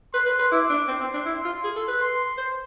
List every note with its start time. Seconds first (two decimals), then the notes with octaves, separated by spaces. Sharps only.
0.14 B4 C6
0.26 B4
0.39 B4
0.52 E4 D6
0.70 D4
0.88 C4 C6
1.01 C4
1.14 D4
1.25 E4
1.45 F4
1.64 G#4
1.76 A4
1.88 B4
2.00 C6
2.38 C5